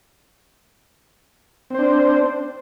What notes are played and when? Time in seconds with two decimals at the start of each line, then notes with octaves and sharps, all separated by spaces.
1.70 C4
1.74 C5
1.79 D4